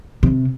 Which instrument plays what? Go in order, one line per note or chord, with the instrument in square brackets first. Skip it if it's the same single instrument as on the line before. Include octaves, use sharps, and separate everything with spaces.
[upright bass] C3